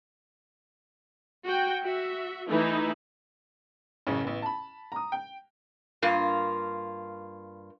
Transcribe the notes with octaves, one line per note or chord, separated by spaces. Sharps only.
F#4 G5
F#4 E5
E3 A3 D#4 E4
A1 F#2 C#3 C#4
A1 B3
A5 B5
A#5 D#6
G5
G2 A#3 F4